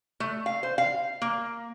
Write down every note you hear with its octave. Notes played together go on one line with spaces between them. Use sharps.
A3
F5
C5
F5
A#3